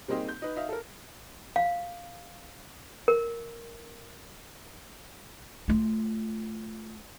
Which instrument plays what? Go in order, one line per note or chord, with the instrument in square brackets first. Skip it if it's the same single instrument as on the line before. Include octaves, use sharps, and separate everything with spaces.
[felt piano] G3 A#3 C4 D#4 G4 G#4
G6
D#4 B4
D#4 E5 F5
A4 A#4
[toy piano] F5
A#4
[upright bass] A3 F4